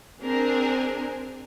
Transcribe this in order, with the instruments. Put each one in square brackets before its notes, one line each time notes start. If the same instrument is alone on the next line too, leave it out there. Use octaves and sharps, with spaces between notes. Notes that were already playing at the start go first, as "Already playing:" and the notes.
[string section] C4 D4 G#4 A#4